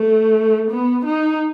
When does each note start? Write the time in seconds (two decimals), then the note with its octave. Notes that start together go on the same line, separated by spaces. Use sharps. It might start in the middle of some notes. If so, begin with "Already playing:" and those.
Already playing: A3
0.70 B3
1.05 D#4